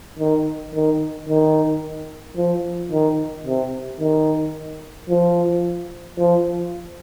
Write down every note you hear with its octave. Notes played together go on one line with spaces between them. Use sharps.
D#3
D#3
D#3
F3
D#3
C3
D#3
F3
F3